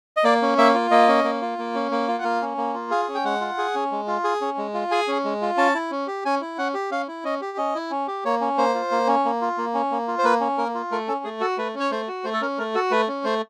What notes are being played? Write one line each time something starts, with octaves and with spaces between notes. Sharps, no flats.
D#5
A#3 D5
C#4
A#3 E5
F4
A#3 D#5
C#4
A#3
F4
A#3
C#4
A#3
F4
F#5
A#3 F5
C#4
A#3
F4
G#4 F5
C#4
G5
G#3 F#5
F4
G#4
C#4
G#3
F4
G#4
C#4
G#3
F4
G#4 G#5
C#4
G#3
F4
C#4 A5
E4
C#4
G4
C#4 G#5
E4
C#4 F#5
G4
C#4 F5
E4
C#4 D#5
G4
C#4 D#5
E4
C#4
G4
A#3 C#5
C#4
A#3 C5
F4
A#3
C#4
A#3
F4
A#3
C#4
A#3
F4
C5
A#3 B4
C#4
A#3 A#4
F4
A3 A#4
C#4 A4
A3 G#4
F#4 A4
A3 B4
C#4
C#5
A3 C5
F#4
A3 C5
A4
C#4 A#4
A3 A#4
F#4 A4
A3 B4
C#4
A3 C5